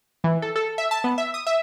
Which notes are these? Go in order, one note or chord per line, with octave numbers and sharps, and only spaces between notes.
E3
A4
A4
E5
A5
B3
E5
D#6
E5